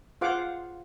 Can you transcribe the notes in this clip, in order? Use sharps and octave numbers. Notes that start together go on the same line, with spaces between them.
F4 G#4 C5 F5 F#5 D6